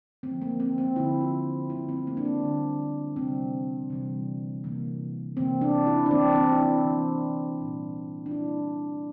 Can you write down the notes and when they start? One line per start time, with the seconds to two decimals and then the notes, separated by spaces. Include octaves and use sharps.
0.23 D3 F3 A#3 C4
0.42 A#3
0.60 C4
0.78 C4
0.96 D3 F3 A#3 E4
1.21 F4
1.70 D3 G3 A#3 E4
1.89 C4
2.07 A#3
2.17 D4
2.25 C4
2.44 D3 G3 A#3
3.16 C3 E3 G3 C4
3.90 C3 E3 G3
4.64 C3 E3 A#3
5.37 C3 E3 A#3 C4
5.61 D4
5.87 E4
6.06 D4
6.11 E3 A#3 C4
6.35 C4
6.51 E4
6.60 D4
6.85 E3 A#3
7.58 A#2 G3 A#3
8.26 D4
8.31 A#2 G3 A#3 E4